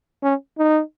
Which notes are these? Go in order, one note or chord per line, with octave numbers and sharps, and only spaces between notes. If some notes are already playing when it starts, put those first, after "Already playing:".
C#4
D#4